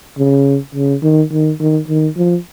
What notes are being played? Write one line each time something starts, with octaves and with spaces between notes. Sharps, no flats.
C#3
C#3
D#3
D#3
D#3
D#3
F3